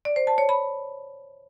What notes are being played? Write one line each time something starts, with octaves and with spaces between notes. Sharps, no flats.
D5
C5
A5
C#5
B5